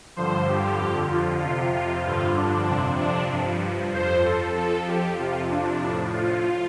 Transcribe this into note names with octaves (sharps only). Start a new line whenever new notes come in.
G2 D3 F3 C5
G4
F2 D3 F3
F4
F2 C3 F3 F4
F4
G2 D3 F3 F4
D4
F2 C3 F3
D4
G2 F3
F2 F3 C5
A4
F2 F3 A4
G4
F2 C3 F3 F4
D4
A2 F3
F4